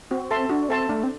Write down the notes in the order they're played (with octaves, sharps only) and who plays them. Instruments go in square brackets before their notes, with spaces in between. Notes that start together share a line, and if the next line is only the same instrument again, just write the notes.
[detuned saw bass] C4 [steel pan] F#4
[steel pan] A4 E5 A5 C6
[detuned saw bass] D4 [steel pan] F#4
[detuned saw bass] C4 [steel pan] A4 E5 A5 C6
[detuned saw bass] A3 [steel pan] D4
[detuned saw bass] C4